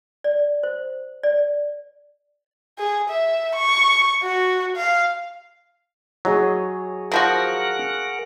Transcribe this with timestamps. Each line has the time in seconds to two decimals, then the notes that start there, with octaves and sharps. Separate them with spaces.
0.24 D5
0.63 C5
1.23 D5
2.78 G#4
3.10 E5
3.55 C#6
4.23 F#4
4.77 F5
6.25 F#3 G#4 C#5 D#5
7.12 D#3 F3 F#4 A#4 F#5